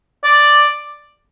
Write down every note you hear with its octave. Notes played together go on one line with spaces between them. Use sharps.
D5